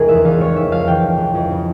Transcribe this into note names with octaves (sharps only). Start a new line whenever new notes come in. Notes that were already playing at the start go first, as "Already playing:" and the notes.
Already playing: F1 C#2 C#3 G#4 A#4
E2 E5
E3 F5
F1 C#5
F1 E5
F2 F5
E3 G5
F1
F1
F2
C#3